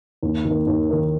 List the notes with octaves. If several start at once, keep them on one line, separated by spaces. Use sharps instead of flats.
D#2
D#3 A#3
D#2
D#3 A#3